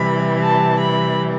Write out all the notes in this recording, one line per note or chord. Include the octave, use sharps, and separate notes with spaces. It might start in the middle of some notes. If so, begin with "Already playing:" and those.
Already playing: C3 E3 G3 B5
A5
B5